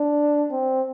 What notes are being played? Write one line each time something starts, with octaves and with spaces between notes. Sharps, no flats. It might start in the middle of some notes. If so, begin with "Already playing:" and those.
Already playing: D4
C4